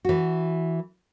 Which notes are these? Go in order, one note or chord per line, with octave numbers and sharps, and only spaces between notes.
E3 F#4